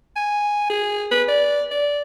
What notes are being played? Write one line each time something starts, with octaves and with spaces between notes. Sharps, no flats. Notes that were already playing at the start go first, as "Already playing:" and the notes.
G#5
G#4
B4
D5
D5